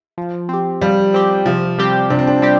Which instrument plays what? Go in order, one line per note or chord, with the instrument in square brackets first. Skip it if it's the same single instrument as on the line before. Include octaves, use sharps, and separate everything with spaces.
[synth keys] F3
C4 G4
[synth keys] F3 [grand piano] G3
[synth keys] C4 G4
[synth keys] C3 [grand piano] F3
[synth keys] G3 C4 G4
[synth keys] C3 [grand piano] D4
[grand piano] C4
D4
[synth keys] G3 C4 G4